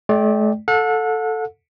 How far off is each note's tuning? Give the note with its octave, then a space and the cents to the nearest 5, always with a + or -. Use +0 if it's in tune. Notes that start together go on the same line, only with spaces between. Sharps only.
A3 -45 D5 +0 G5 +0
A4 +0 F#5 -40